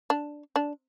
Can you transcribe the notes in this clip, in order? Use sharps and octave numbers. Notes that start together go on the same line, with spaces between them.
D4
D4